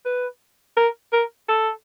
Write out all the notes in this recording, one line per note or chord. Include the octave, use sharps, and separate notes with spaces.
B4
A#4
A#4
A4